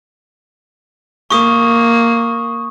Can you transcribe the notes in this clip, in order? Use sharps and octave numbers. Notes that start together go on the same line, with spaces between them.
A#3 C#6 D#6